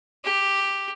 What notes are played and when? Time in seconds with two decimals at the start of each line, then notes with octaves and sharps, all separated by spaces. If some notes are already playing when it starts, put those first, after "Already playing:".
0.24 G4